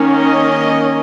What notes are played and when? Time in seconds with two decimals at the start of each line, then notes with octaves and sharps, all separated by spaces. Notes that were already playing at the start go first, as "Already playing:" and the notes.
Already playing: D#3 A#3 C#4
0.13 D#5